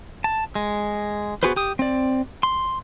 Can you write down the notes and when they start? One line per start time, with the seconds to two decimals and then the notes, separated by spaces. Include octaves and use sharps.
0.24 A5
0.55 G#3
1.43 B3 F#4 G#4 B4 C5
1.56 G4 D#6
1.79 C4 D5
2.43 C6